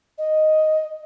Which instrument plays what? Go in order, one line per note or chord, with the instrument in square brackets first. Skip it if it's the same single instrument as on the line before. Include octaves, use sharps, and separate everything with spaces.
[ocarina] D#5